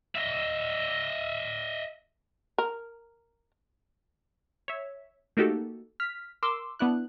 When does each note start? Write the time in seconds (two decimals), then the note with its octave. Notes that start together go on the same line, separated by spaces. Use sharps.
0.15 D#5 E5
2.58 A#4
4.68 C#5 E5
5.37 A3 A#3 D#4 F#4 G4 A4
6.00 F6 B6
6.43 A#4 C6 D6 E6
6.79 B3 D4 E4 F#6